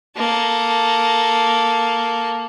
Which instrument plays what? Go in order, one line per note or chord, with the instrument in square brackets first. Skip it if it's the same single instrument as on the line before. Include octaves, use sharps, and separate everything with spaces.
[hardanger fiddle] A#3 A4